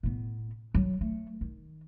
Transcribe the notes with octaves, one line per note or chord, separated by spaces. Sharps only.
A2 B3
F#3
A3
D#3